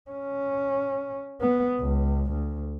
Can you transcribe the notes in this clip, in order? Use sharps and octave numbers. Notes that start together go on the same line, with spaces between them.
C#4
B3
C#2
D2